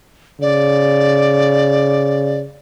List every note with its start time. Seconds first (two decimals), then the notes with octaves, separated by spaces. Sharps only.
0.41 C#3 D5